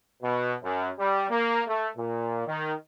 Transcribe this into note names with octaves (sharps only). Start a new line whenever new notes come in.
B2
F#2
G3
A#3
A3
A#2
D#3